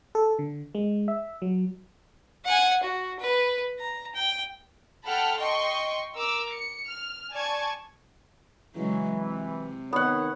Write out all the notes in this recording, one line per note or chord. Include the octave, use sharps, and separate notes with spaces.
A4
D3
G#3
E5
F#3
F#5 G#5
F#4
B4
A#5
G5
A4 F#5 G5 A5 B5 F6
D#5 G5 C6 C#6
A#4 D6 E6
C#7
F6
D5 G#5 A5 C#6 G#6
C#3 E3 F#3 G#3
C3
D#3 B3 C#5 F#5